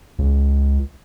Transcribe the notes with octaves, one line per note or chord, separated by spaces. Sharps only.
C#2